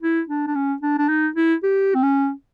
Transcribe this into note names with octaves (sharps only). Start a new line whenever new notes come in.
E4
D4
D4
C#4
D4
D4
D#4
E4
G4
C4
C#4